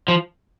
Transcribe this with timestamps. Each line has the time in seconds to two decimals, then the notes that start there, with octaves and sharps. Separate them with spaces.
0.08 F3